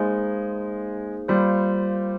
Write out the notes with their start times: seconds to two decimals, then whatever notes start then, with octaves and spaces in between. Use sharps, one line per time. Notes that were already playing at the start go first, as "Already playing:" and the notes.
Already playing: G#3 A#3 D#4 G#4 C5
1.28 G3 A#3 F4 C5